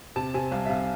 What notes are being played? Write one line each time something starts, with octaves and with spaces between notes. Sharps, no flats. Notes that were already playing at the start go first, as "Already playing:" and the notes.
C3 A5
C3 G#5
C2 F5
E5
C3 F5